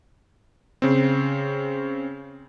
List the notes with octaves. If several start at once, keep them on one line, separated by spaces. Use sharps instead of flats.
C#3 C4